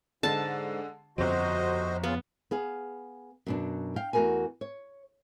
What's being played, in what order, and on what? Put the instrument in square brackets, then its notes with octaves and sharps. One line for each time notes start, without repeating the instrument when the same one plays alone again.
[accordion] G#2 [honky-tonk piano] D3 G#3 [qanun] A5
[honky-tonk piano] G1 C4 [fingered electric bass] F2 F3 [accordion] F#4 C5 D#5
[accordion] C#3 F4 [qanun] B3
[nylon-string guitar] B3 G#4 F5
F#2 B2 D4
F5 G5
E2 A3 F#4 A#4 B4 G#5
C#5